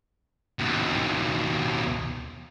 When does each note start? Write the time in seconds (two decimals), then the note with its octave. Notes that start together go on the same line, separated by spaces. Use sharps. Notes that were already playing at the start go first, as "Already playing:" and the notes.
0.59 D#2 B2